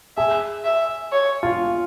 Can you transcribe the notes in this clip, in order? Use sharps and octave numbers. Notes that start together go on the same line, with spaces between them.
G#4 E5
E5
C#5
F4